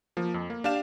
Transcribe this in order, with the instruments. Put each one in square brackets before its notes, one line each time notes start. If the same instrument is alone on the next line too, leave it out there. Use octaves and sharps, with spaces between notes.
[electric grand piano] F3 A#3
F2
A#3
D4 G4 F5 E7